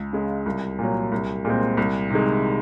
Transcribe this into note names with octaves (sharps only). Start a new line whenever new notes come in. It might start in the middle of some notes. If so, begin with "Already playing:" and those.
Already playing: C#2
C#3 G#3
C2
A#2 F#3
C2
A#2 G#3 C4
C2
C3 D#3 G#3